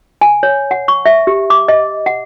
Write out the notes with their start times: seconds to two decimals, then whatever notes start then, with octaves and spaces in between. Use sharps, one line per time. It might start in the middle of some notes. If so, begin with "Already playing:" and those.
0.21 G#5
0.43 C#5
0.71 F#5
0.88 C#6
1.06 E5
1.27 G4
1.50 D6
1.68 D#5
2.06 F#5